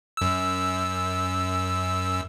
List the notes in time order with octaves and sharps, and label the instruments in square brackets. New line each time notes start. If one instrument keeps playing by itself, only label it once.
[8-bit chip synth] F#2 E6